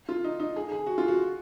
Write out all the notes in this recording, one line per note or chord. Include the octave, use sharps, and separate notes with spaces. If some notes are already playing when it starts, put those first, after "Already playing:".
F4
D#4
D#4
G#4
G#4
F#4
F4
F#4